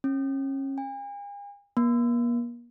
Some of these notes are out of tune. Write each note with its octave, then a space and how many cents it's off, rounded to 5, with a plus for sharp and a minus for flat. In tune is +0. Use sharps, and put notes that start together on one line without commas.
C#4 -30
G#5 -45
A#3 +40